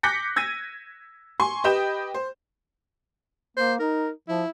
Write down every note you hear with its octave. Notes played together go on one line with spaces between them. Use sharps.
D6 F#6 G6 A#6 B6 C#7
E6 G#6 A#6 D#7
G#5 C6 C#6
G4 B4 D#5 G5 G6 E7
C5
A#3 C5
D#4 A#4
F3 E4